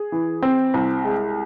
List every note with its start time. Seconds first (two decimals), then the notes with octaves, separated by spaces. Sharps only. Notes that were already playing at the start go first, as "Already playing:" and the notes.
Already playing: G#4
0.12 E3
0.42 C4
0.74 C2
1.04 G#3